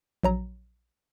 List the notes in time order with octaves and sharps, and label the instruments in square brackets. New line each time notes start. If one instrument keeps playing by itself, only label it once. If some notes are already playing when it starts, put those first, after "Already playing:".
[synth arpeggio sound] A#1 F#3 A#5